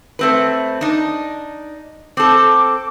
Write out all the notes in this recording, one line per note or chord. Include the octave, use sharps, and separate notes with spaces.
A3 C4 B4
D4 D#4
C4 A4 D6